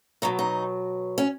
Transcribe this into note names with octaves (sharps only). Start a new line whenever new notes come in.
B2 F#3 D#4
D#4
C#4